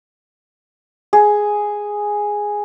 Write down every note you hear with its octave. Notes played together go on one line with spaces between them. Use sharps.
G#4